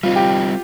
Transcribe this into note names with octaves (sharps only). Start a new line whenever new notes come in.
G3 C4 D#4 F4
G4